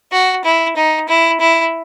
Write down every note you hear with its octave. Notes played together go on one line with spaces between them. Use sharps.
F#4
E4
D#4
E4
E4